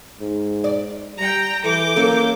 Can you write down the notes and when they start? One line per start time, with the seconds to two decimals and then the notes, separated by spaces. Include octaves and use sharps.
0.21 G#2
0.64 D5
1.18 G3 G5 A#5
1.64 E3 A4 D6 G6
1.96 F#3 A#3 C#4 A4